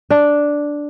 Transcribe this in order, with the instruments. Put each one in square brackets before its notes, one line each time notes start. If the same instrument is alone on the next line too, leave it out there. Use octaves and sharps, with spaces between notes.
[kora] D4